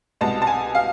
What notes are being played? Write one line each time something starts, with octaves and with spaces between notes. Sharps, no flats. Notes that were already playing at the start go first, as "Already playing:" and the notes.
C2 B2 G#3 A5
A5
G#5
F5